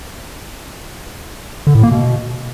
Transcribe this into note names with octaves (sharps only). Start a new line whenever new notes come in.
D3
A2
A#3
B2